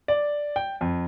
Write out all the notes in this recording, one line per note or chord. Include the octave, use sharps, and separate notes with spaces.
D5
G5
F2